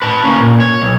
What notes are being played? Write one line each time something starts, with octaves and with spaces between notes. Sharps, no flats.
B4 A5
A#3 C#4
A#2
C#5
B1